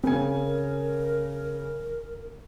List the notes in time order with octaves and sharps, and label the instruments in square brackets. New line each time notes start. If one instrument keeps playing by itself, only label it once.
[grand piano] C#3 G#5 [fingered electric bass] C4 [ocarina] A#4